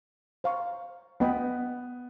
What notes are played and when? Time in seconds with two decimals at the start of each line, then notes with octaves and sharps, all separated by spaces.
0.44 C5 F5 A#5 C#6
1.20 B3 B4 D#5 G5 B5